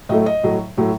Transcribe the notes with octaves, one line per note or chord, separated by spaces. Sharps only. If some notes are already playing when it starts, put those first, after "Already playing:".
A2 F#3 A3 D#5
D#5
A2 F#3 A3
A2 F#3 A3